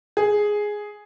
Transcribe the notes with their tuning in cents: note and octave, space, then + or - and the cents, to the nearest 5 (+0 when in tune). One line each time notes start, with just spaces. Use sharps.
G#4 +0